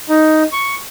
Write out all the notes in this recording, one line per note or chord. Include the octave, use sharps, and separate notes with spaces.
D#4
C#6